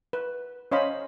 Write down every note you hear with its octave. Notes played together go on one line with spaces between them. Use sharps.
B4
C#4 C5 C#5 D#5 F5 B5